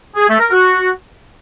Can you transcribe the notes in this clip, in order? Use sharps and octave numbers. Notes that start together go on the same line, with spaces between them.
G#4
A3
A#4
F#4